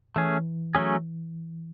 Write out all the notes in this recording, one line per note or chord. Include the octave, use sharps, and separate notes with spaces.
E3 A3 C#4 G#4
F#3 A3 C#4 G#4